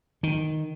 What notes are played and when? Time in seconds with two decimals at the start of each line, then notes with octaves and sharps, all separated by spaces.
0.23 D#3